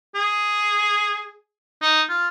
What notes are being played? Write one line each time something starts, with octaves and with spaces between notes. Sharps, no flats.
G#4
D#4
F4